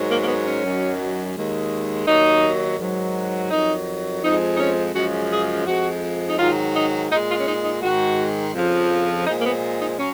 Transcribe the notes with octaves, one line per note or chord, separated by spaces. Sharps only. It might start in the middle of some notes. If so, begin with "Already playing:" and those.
Already playing: G#2 D#3 F#3
A#3
A#3
B3
C#4
F#2 D#3 F#3
D#2 D#3 G#3
D#2 D#3 F#3 D#4
G#2 D#3 F#3
F2 D#3 F#3 D#4
F2 F3 G#3 D#4
D#4
C#4
F#2 C#3 F3 G#3 F#4
G#4
F2 F3 G#3 F#4
D#4
G#2 D#3 F#3 F4
D#4
A#2 G#3 D#4
F4
C#4
D#4
D#4
G#2 D#3 G#3 F#4
F2 C#3 F3
A#2 F3 G#3 D#4
A#3
B3
D#4
F#3 C#4